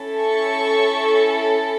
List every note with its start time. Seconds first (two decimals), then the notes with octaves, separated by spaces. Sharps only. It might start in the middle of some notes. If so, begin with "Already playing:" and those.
Already playing: C#4 E4 A4
0.21 C#6